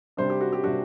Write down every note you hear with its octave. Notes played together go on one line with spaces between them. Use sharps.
C3 G3 D4 C5
G4
F#4
G4
C3 G3 D4 F#4